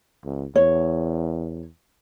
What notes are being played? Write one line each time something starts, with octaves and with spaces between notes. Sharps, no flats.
C#2
E2 C#5